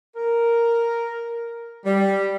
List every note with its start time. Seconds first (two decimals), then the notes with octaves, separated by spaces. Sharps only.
0.16 A#4
1.85 G3